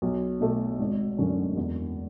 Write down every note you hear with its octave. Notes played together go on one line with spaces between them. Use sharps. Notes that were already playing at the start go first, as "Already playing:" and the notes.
B1
B2 A3
G#1
F#2 D3 F#3 C#4
E2